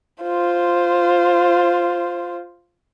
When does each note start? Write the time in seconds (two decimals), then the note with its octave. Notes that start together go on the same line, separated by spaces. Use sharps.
0.23 F4 C5